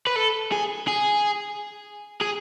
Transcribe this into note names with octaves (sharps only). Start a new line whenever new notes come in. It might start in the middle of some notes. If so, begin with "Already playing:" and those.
B4
A4
G#4
G#4
G#4